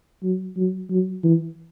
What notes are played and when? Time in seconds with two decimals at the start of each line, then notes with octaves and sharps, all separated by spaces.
0.23 F#3
0.56 F#3
0.90 F#3
1.24 E3